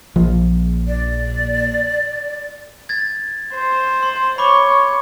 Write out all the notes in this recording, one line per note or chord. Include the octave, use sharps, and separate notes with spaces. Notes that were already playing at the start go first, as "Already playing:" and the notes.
A#1 F3
D5
G#6 A6
C5
C6
C#5 B5 C#6 D6